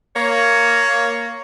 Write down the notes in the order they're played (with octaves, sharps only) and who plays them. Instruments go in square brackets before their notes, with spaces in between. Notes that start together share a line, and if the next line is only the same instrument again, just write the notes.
[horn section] A#3 C#5